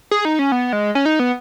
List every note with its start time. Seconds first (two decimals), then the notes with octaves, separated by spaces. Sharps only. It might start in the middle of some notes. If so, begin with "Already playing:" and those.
0.11 G#4
0.25 D#4
0.39 C#4
0.52 B3
0.73 G#3
0.95 C#4
1.06 D#4
1.20 B3